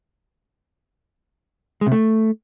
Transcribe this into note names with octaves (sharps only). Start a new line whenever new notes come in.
G#3
C3
A3